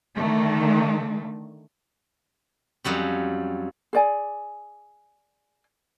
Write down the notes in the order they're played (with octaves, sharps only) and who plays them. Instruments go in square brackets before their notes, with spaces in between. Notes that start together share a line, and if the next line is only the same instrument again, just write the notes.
[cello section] D3 D#3 A3
[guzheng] F2 F#3 G3 C#4
[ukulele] G#4 D5 G#5